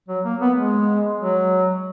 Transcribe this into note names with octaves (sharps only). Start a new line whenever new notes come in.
F#3
A#3
B3
G#3
F#3